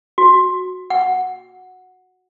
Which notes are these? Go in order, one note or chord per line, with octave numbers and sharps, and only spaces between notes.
F#4
F#5